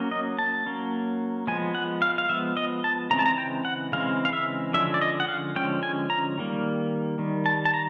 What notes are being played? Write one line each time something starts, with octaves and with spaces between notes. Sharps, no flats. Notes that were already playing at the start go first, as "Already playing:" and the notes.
Already playing: F#3 A#3 C#4
D#5
A5
F#3 A#3 C#4
F3 G#3 B3 G#5
F#5
F5
F5
F3 G#3 B3 E5
D#5
A5
C#3 E3 G#3 C4 A#5
A5
A#5
G5
F#5
C#3 E3 G#3 C4 F5
F5
E5
D3 F3 G#3 C#4 E5
D5
D#5
F#5
F5
D3 F3 G#3 C#4 G5
G#5
A#5
D#3 G3 A#3
D#3 G3
A5
A5
A#5